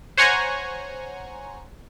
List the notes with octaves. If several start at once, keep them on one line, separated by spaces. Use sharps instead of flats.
C5 C#5 F#5 G#5 A#5 C#6